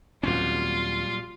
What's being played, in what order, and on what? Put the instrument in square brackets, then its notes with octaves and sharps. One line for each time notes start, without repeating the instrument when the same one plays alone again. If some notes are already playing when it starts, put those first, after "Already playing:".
[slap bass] D#2 C4 C#4 [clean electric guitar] A#2 F#3 G3 [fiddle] F4